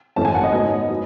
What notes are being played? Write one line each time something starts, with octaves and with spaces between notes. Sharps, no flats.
G#1 F#2 E3 A3 C#4 A5
G#5
F#5
D#5
G#2 F#3 B3
F#3